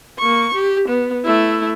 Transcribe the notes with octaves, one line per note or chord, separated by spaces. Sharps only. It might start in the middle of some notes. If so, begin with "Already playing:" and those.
A#3 C#6
G4
B3
A3 E4